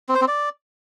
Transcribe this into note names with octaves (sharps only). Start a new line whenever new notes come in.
C4
C5
C4
D5